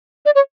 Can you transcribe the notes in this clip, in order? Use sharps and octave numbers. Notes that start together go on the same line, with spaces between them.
D5
C#5